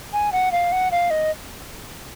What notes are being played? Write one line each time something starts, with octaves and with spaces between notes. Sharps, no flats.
G#5
F#5
F5
F#5
F5
D#5